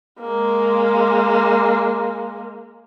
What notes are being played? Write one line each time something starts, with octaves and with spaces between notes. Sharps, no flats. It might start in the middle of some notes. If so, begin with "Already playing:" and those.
G#3 A#3